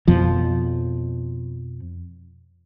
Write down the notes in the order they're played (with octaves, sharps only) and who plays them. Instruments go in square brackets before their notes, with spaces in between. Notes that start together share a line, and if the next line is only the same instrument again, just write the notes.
[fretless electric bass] F2 B2 F3